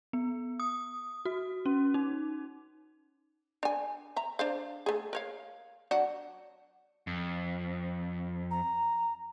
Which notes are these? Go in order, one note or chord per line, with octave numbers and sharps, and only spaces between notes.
B3
D#6
F#4
C#4
D#4
D4 G#5
E5 A#5
D4 C5 F5
A3 G#4
A#4 C#5 F5
F#3 D4 F#4
F2
A#5